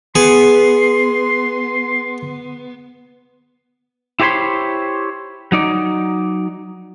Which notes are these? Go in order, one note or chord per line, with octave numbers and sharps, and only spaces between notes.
B3 G#4 C6
E4 G4 C5 C#5 B5 C6
F#3 D#4 D5